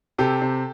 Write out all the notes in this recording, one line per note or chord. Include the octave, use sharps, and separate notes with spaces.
C3 G4 A4
C3